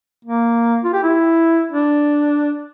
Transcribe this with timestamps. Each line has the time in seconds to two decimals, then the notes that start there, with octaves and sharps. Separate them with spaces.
0.25 A#3
0.84 F4
0.93 G4
1.03 E4
1.72 D4